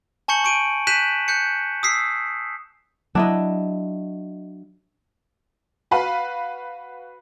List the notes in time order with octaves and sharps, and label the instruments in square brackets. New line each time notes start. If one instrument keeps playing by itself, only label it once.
[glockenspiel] G#5 A5 C#6 G6 C#7 F#7
C#6 D7 D#7
F#6 G6 B6 D#7 E7 F#7
F#6 G6 C#7
D#6 E6 B6 C7
[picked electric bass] F#3 [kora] D4 E4 D#5
[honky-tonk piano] F#4 B4 F5 B5